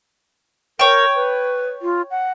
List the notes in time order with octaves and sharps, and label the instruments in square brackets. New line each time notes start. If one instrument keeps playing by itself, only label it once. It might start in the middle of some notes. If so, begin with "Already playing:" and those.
[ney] A#4 [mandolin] C#5 G5
[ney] B4
F4
F#5